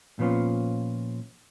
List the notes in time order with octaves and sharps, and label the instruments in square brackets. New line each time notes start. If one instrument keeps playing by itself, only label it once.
[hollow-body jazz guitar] A#2 F3 B3 C#4 F4